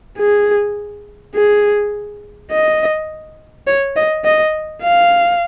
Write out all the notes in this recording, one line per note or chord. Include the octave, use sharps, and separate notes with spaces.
G#4
G#4
D#5
C#5
D#5
D#5
F5